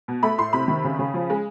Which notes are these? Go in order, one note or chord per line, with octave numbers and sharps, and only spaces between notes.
B2
A3 B5
A2 C6
C3 B5
D#3
C#3
C#3
F3
G#3